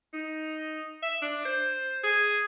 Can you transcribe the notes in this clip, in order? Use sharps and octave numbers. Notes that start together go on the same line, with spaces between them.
D#4
E5
D4
C5
G#4